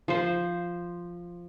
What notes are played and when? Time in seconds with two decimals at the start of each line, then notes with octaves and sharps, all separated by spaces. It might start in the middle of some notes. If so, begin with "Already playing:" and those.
0.08 F3 C5